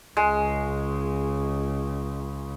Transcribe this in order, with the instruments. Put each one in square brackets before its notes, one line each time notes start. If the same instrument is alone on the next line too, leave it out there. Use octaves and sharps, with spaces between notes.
[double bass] C#2 C#3 [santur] G#3